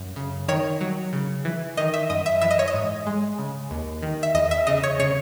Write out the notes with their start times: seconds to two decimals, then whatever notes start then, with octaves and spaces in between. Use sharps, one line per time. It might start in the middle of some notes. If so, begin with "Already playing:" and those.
Already playing: F#2
0.16 C#3
0.48 D#3 C#5
0.81 F#3
1.13 C#3
1.45 E3
1.77 D#3 D#5
1.94 E5
2.10 F#2 D#5
2.26 E5
2.41 E3 E5
2.51 D#5
2.59 C#5
2.68 D#5
2.74 G#2
3.06 G#3
3.39 C#3
3.71 D#2
4.02 D#3
4.23 E5
4.34 E2 D#5
4.51 E5
4.67 C#3 D#5
4.83 C#5
4.99 C#3 C#5